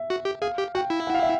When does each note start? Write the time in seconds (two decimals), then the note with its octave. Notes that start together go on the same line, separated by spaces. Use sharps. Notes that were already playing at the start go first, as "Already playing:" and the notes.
Already playing: E5
0.10 F#4
0.25 G4
0.42 G#4 F5
0.58 G4
0.75 F#4 G5
0.90 E4
1.07 F#5
1.14 F5
1.22 E5